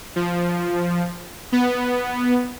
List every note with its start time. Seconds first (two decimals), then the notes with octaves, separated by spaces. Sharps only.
0.16 F3
1.52 B3